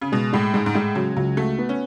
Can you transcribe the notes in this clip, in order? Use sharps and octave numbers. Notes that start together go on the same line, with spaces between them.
C#3
B2 G#3
A2 G#3
G#2 G#3
G#2
A2 G#3
C#3 F#3
C#2 F#3
A3 F#4
B3
C#4